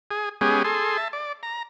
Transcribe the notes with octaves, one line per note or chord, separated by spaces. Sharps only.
G#4
G#3 B3 C#4 G4 G#4
G#4 A4 C6
E5 A5
D5
A#5